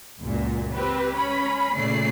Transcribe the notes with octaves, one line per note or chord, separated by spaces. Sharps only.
C#2 F#2 A#2
C4 G4 B4
C#4 B5
A#2 C#3 A3 D5 C7